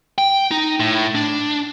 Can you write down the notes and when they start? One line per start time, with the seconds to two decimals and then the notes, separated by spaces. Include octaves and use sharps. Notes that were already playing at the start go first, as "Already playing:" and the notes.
0.18 G5
0.51 D#4
0.80 A2
1.15 D4